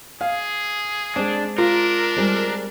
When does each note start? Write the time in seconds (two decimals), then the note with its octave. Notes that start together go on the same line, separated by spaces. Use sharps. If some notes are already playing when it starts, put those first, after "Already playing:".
0.21 G#4 F5
1.16 G#3 C4 D4
1.58 D4 F4 A#4
2.16 G3 G#3 C4